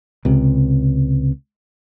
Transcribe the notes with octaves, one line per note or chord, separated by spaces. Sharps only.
C#2 C3